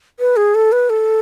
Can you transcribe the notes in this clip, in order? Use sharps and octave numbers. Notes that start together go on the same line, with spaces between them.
B4
G#4
A4
B4
A4